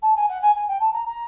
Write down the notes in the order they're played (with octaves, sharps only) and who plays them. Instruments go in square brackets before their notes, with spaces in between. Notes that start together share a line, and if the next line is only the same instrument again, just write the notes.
[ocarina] A5
G#5
F#5
G#5
G#5
G5
A5
A#5
A#5